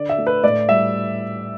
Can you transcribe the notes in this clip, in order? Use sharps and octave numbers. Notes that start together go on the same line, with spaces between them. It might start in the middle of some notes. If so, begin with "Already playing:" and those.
Already playing: D3 D5
E5
A3
B4
A2 D5
G3 E5